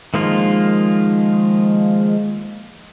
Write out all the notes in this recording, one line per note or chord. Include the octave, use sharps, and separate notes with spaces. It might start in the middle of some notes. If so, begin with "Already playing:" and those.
D#3 F3 G#3 A#3 F4